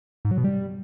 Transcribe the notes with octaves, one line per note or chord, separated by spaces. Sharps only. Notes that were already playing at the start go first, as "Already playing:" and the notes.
G#2
F#3
B2
G3